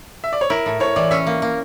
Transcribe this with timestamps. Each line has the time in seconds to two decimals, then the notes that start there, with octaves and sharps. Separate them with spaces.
0.24 E5
0.33 D5
0.41 C#5
0.50 E4 A#4
0.66 A2
0.80 A2 C#5
0.96 E3 D5
1.11 C#4 E5
1.27 A#3
1.42 A#3